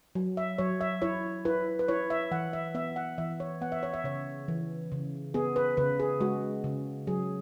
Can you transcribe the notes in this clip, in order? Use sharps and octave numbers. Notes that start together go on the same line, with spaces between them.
F#3
E5
F#3 C#5
E5
E4 C#5
E4 B4
B4
E4 C#5
E5
E3 F#5
E5
B3 E5
F#5
E3 E5
C#5
B3 F#5
E5
C#5
E5
C#3 C#5
E3
C#3
B3 G#4
B4
C#3 B4
G#4
G#3 F#4
C#3
F#3 G#4